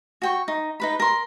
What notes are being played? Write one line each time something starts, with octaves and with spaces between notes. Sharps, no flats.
F#4 G5 C#6
D#4
D#4 B4 B5
A#4 C6